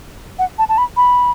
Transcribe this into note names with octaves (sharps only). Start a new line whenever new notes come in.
F#5
A5
A5
B5
B5